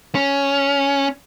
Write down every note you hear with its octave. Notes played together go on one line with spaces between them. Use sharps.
C#4